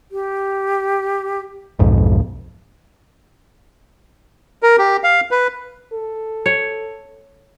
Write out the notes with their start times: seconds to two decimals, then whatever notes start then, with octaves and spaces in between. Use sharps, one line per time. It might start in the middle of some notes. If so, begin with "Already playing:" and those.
0.12 G4
1.79 B1 F2 G#2
4.63 A#4
4.78 G4
5.04 F5
5.31 B4
5.93 A4
6.46 C#5